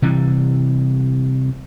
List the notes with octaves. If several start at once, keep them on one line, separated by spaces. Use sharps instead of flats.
C3 E3 G3